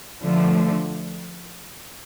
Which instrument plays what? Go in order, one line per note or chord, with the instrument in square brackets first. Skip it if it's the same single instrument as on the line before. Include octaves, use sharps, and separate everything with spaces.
[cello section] D3 F3 A3